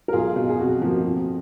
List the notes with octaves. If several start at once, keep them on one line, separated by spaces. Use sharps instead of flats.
A#4
B1 F4 G#4
B2 F#3
G#4
F2 F#4
F3 A#3
F2